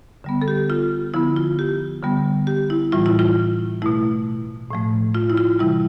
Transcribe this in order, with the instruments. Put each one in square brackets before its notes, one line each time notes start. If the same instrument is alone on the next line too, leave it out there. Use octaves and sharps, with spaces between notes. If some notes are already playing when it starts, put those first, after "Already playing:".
[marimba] D3 G3 B3
A4
G4
F4
D3 F3 B3 E4
F4
G4
D3 G3 B3
G4
E4
A2 E3 G3 F4
E4
F4
B2 A3 E4
A2 F3 A3
F4
E4
F4
C3 E3 G3 E4